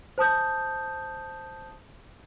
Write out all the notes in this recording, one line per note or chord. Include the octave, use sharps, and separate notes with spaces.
C5 A5 D#6 G6